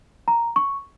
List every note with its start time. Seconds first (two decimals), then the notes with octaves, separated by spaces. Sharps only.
0.28 A#5
0.56 C#6